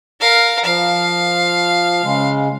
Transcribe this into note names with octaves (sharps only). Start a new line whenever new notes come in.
A#4 F5
F3 F5
C#3 G#3